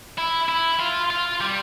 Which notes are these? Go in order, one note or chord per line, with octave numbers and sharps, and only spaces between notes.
E4
E4
F4
F4
G3